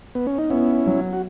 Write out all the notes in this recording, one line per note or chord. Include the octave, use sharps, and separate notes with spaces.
B3
C#4
D#4
B3 C#4 E4
F#3
F#4